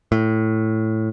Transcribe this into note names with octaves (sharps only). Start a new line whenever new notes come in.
A2